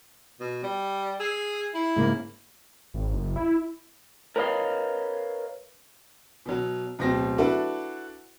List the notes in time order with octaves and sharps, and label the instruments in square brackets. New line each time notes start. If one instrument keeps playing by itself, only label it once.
[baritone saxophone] B2
G3
[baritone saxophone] G#4 [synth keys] E6 C7
[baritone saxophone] E4
[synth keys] G#2 C#3 A#3
[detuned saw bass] G#1
F#1
E4
[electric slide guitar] A#4 B4 C#5 D#5 F5
[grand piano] B2 F#3
D1 B2 C4 A#6
D4 E4 F#4 A4 B4